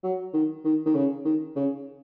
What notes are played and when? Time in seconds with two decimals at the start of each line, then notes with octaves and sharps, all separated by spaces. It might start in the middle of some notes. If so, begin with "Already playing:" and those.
0.03 F#3
0.34 D#3
0.65 D#3
0.86 D#3
0.95 C#3
1.25 D#3
1.56 C#3